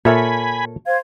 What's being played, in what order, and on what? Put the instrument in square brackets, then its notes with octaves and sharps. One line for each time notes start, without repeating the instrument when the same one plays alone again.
[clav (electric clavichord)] A#2 E5 [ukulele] A4 A#4 C#5 [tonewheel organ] G#5 B5
[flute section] C5 F5 G#6